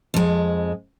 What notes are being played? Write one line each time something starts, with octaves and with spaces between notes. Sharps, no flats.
F2 G#3